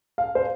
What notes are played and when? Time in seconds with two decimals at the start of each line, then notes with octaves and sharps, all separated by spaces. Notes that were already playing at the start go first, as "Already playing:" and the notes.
0.18 F5
0.35 C5